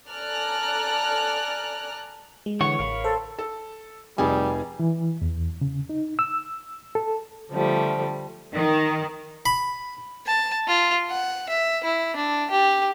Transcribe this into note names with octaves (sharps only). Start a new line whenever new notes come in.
A4 D5 G#5 A#5 F6 F#6
G#3
D3 E3 C#5 F#5 C#6
A1 A#4 F5 B5
A4 C5
A4
F1 G3 D#4 G#4 G#5
E3
E2
C#3
D#4
E6
A4
D3 F3 G3 A3
D#3
B5
A5
F4
F#5
E5
E4
D4
G4